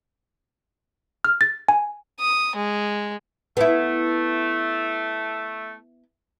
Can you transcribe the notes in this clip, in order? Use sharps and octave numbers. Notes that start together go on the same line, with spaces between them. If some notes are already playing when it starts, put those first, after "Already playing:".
F6
A6
G#5
D#6
G#3
A3 B3 E4